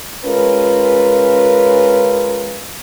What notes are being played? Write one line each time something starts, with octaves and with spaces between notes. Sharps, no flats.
G#3 C#4 F4 A#4 B4